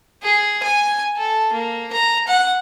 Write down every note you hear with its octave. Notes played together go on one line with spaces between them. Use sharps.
G#4
G#5
A4
A#3
A#5
F#5